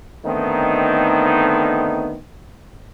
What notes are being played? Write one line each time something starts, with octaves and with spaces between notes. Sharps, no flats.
D3 D#3 A3 B3 C4 D#4